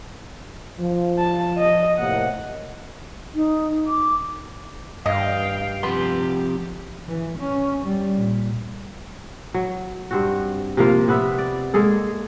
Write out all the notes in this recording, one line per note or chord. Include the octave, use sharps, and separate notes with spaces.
F3
A5
D#5
A2 C3 A#3 F#5
D#4
D6
G2 D#5 F5 G5
C3 F3 B3 G4 C6
E3
C#4
G3
A#2
F#3
G2 C4 F#4
C3 F3 A#3 F4
C3 B3 B4 E5
D5
G#3 A#3 G#4 A4